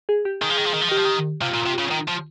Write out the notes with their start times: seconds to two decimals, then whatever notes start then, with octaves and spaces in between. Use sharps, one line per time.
0.09 G#4
0.25 G4
0.41 D#3 G#4
0.50 F3
0.57 D#3
0.65 F3
0.74 D#3
0.81 F3
0.89 D#3 G4
0.97 F3
1.05 D#3
1.41 C3 F4
1.54 A#2
1.66 C3
1.79 C#3
1.91 D#3
2.08 F3